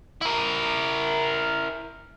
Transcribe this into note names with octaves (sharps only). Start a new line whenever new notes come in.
E4 A#4